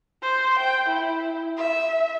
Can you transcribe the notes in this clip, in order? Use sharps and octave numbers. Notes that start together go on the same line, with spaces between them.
C5
G5
E4
E5